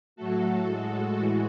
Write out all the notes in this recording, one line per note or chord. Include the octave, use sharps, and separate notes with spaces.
A2 F#3 A3 F#4 A4
A2 G#3
A2 E3 G#3 F#4